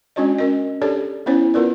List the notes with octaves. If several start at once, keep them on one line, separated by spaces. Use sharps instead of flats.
G#3 C#4 D4 F#4 C#5 D#5
C#4 A#4 D#5
D4 G4 A4 C#5 D5
B3 C#4 E4 C5 C#5
B3 F4 A#4 B4 D5